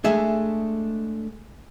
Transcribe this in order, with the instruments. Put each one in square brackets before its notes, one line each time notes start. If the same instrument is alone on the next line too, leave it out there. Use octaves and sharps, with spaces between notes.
[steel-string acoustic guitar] G#3 A3 D4 [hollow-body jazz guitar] G#4 E5